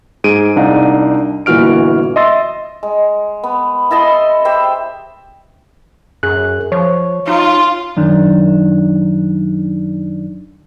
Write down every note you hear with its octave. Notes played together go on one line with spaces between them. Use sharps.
G#2 G#4 D7 D#7
C2 D4 D#4 F5 F#5
G1 A#2 E3 F#4 F6 D7
D#5 E5 C6 E6 A6 A#6
G#3
B3
E4 D#5 A5 C6
G4 C5 E5
F#2 G#4 F#6
F3 C#5
D#4 F4
F#2 D#3 D4